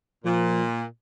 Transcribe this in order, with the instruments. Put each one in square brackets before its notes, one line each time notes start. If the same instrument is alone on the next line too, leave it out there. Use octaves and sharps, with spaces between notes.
[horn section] A#2 [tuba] F3